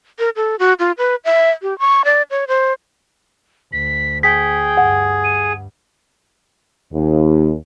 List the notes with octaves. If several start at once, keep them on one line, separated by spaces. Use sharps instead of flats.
A#4
A4
F#4
F4
B4
E5
G4
C#6
D5
C#5
C5
D2 B6
G#4 G5 B6
G2 F#5
D#7
D#2